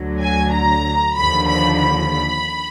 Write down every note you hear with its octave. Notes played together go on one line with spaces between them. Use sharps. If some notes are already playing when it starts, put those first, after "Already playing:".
Already playing: D2 D3 F#3
G#5
A#5
D#2 D3 F3 B5
B5
B5